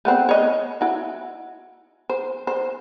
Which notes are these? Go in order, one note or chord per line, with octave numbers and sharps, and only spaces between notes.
A3 B3 C4
C#5 D#5
E4 F#4
C5
C5